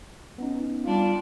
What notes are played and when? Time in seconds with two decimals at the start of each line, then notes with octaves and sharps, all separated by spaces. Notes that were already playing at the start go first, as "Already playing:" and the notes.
0.38 B3 C#4 D#4
0.85 G3 D4 F4